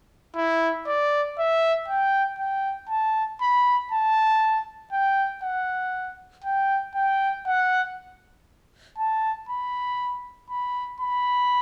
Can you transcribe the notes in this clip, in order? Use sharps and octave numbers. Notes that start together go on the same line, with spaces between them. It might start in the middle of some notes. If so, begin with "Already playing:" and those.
E4
D5
E5
G5
G5
A5
B5
A5
G5
F#5
G5
G5
F#5
A5
B5
B5
B5